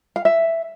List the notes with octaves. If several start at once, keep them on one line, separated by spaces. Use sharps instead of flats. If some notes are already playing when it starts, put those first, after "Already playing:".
F5
E5